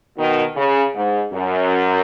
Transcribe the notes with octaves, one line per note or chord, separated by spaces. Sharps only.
B2 D#3
C#3
G#2
F#2